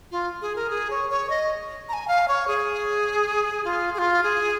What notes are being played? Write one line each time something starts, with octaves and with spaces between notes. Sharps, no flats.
F4
G#4
A#4
G#4
C#5
C#5
D#5
A#5
G#5
F5
C#5
G#4
F4
G#4
F4
G#4